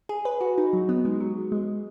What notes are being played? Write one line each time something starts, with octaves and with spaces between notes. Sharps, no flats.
G#4
B4
F#4
D#4
F#3
B3
G#3
F#3
G#3